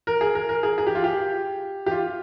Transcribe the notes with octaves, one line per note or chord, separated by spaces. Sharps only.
A#4
G#4
A#4
A#4
G#4
G#4
G4
F4
G4
G4
F4